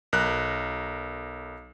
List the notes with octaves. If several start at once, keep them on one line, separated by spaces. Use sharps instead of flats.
B1 A#4 F#6